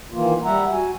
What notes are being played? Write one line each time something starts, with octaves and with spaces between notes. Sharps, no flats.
D#3 E3 A#3 F4
G3 E5 F#5 A#5
F#4 G#5